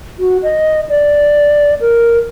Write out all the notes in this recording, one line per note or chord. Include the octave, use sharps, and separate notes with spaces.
F#4
D#5
D5
A#4